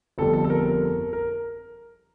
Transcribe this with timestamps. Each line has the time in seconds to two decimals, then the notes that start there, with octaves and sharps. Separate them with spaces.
0.18 G1 F2 D3 G3 A4
0.33 A4
0.44 A4
0.50 A#4
0.66 A#4
1.13 A#4